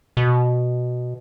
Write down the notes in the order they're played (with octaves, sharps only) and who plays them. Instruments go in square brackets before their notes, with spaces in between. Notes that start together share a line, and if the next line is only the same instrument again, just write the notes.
[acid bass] B2